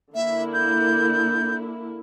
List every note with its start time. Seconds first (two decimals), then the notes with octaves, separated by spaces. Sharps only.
0.15 D3 A#3 E4 E5
0.54 G6